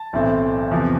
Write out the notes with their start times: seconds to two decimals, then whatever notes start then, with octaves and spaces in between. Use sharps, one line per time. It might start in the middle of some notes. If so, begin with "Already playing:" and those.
Already playing: A5
0.13 B1 A2 E3 A3 C4
0.71 E2 C3 F3